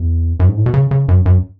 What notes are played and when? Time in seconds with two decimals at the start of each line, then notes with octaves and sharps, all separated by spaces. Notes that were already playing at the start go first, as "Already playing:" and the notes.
Already playing: E2
0.40 F#2
0.48 G#2
0.57 A2
0.66 B2
0.74 C#3
0.91 C#3
1.08 F#2
1.26 F#2